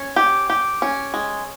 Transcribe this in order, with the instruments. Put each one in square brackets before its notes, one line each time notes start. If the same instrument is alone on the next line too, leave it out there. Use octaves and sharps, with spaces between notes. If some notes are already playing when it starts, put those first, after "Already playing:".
Already playing: [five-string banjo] C#4
G4
G4
C#4
G#3